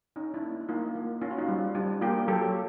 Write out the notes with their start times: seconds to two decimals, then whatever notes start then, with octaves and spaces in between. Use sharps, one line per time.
0.16 C#4 D#4
0.34 D4 E4
0.42 A#3
0.61 E4
0.69 A#3 D#4 F4
0.95 A#3
1.21 C#4 F4
1.31 F#4
1.38 D#4 F4
1.48 G3
1.75 G3 D4
2.01 A#3 F4 G4
2.28 F#3 G4 A4